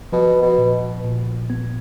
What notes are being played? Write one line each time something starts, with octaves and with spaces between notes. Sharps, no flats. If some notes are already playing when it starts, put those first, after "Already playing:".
B2 F3
B2
A#2
A#2
B3